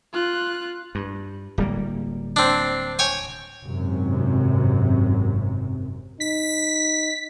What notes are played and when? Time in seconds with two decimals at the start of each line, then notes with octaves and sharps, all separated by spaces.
0.13 F4 F#6
0.95 G2
1.58 D1 G3 A#3
2.36 C4 D4
2.99 C#5 G5 G#5
3.64 G#1 F#2 C3
6.20 D#4 B6